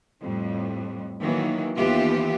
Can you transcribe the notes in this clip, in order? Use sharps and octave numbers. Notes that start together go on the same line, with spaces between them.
F2 A2 G3
D#3 E3 F#3 A#3
D#2 E3 B3 F4 G4 E5